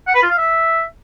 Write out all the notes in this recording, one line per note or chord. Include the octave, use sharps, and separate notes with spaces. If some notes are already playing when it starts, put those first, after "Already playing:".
F#5
B4
F4
F5
E5